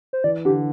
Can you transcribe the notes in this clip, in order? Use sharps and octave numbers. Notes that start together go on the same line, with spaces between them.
C5
E3 D5
D3 G4